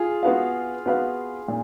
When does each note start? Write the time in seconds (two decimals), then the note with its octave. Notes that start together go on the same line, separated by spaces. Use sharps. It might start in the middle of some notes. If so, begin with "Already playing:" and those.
Already playing: F4 G#4
0.23 B3 F#4 B4 F5
0.86 B3 F#4 B4 F5
1.48 A#2